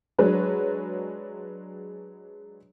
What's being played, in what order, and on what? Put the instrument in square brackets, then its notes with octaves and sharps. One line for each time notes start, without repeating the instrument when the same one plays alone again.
[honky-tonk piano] F#3 G#3 D4 B4 C#5